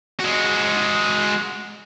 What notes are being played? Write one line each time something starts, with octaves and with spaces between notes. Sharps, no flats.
G#3 F#4